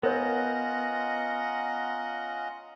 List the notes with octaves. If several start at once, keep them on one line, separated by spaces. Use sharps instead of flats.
B3 C#4 F4 A#4 C#5 D#5 F#5 A#5